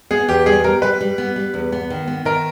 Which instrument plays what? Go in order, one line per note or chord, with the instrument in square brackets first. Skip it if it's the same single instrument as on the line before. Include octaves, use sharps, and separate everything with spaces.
[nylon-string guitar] B3 [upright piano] G#4
[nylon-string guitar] E2 [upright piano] G4
[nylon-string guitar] G3 [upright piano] G#4
[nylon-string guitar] G3 [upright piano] A#4
[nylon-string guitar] G3 [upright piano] B4
[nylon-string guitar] G3
B3
G3
E2
B3
D#3
B3
[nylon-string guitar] D#3 [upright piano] A#4